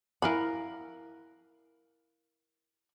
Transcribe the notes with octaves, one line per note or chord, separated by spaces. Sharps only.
E4 A#4 F5 F#5 G#5 B5